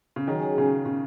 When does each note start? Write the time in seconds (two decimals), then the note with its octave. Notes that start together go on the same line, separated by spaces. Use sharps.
0.16 C#3
0.27 D#3 F#3 C#4 G#4
0.58 C#3
0.86 C#3